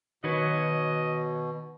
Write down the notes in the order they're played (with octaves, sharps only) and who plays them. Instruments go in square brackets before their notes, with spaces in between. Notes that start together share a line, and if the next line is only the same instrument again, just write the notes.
[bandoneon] B2 [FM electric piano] D#3 [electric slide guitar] F#4 B4 C#5 [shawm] D#5